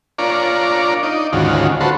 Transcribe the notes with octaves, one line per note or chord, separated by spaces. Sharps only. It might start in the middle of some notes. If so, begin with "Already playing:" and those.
D4 F4 A#4 C#5 D5
D#4 D5
D2 G#2 D#3 C#4 F4 F#4
B3 F#4 A4 C5 C#5